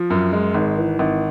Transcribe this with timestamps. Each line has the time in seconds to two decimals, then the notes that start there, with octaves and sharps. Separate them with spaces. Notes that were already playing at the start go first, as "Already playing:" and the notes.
Already playing: F3
0.10 F#2
0.32 G#3
0.55 G#1
0.78 E3
0.99 G#1